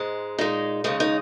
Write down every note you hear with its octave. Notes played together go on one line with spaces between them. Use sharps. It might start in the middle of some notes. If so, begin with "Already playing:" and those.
Already playing: G#2 G#3
A#2 G#3 D#4
D#2 C#3 G#3 D#4
D#4